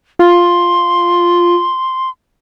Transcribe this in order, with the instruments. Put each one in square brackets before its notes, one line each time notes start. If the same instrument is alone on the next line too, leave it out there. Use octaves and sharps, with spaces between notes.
[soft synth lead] F4 [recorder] C6